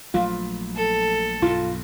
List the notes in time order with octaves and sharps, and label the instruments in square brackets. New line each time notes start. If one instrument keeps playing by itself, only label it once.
[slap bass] A#1 F#3 A3 [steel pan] F4
[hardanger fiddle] A4
[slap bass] B1 G2 B2 [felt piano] F4